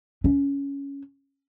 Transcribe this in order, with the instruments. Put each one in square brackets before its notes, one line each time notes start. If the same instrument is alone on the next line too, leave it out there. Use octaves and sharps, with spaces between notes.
[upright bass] C#4